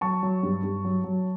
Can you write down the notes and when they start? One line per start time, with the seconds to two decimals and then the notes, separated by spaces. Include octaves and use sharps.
0.01 F#3 A5 C#6
0.23 F#3
0.43 G2
0.64 G2
0.85 F#3
1.04 F#3